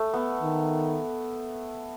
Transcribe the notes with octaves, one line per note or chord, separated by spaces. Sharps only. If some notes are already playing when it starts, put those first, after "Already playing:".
Already playing: A3
B3
D#3